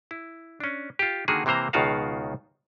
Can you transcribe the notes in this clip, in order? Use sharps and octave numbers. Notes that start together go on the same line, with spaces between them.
E4
C#4 D4
F4 G4
D3 D#3 A#3 F#4 G#4
C3 E3 A#3 C5 A#5
C#2 B2 D#3 F4 F#4 F5